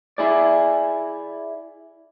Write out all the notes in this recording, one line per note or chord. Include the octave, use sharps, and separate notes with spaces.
E4 G#4 D5